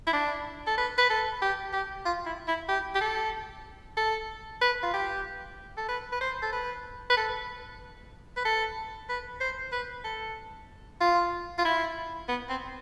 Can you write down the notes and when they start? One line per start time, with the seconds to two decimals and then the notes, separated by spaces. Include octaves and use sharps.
0.07 E4
0.13 D4
0.67 A4
0.78 B4
0.98 B4
1.10 A4
1.42 G4
1.73 G4
2.05 F4
2.26 E4
2.48 E4
2.68 G4
2.95 G4
3.01 A4
3.97 A4
4.61 B4
4.83 F4
4.94 G4
5.77 A4
5.88 B4
6.12 B4
6.21 C5
6.42 A4
6.52 B4
7.10 B4
7.17 A4
8.37 B4
8.45 A4
9.09 B4
9.41 C5
9.72 B4
10.04 A4
11.00 F4
11.58 F4
11.65 E4
12.28 B3
12.49 C4